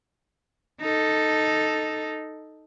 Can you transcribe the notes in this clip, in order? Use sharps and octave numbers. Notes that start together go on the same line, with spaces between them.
D#4 A4